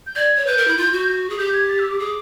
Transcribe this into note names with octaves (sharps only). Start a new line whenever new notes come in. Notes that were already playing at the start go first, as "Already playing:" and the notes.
G6
D5 G#6
C#5
B4 G6
A#4
E4
F4
F#4
G#4
G4 G6
G#6
A6
E6
D6
G#4 D6